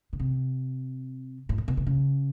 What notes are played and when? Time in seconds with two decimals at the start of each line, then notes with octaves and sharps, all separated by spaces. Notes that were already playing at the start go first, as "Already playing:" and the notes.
0.13 C#3
0.20 C3
1.49 A2
1.58 A#2
1.68 B2
1.77 C3
1.87 C#3